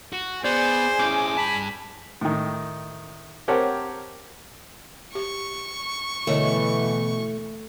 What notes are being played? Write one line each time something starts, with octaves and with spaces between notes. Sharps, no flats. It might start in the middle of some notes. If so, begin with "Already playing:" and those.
F#4
B3 G#4 C5 D5
C#4 E4 D6
G2 A5 B5
A2 D#3
C4 G4 A#4 C#5 F#5 A5
G4 C#6
B2 D3 E3 A3 C#5 D#5